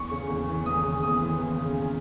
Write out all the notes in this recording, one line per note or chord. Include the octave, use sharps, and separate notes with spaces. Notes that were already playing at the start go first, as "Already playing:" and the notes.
Already playing: E2 C#6
C#3
E2
E3
E2 D#6
C#3
E2 D#6
E3
E2
C#3